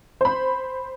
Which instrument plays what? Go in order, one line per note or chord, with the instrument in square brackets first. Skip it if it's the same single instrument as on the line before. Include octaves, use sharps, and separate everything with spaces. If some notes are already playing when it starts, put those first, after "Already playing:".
[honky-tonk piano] C5 B5